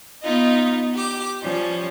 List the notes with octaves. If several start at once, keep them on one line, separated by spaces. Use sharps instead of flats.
B3 D#4 F4 D#5
G4 D6
F3 G3 C#4